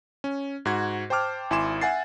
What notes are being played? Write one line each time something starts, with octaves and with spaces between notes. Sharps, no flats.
C#4
G#2 F#4 G#6
C5 G5 A5 D6 F6
G#1 E4 G#5 C6 D6 E7
E5 F#5 G#5 A6 C7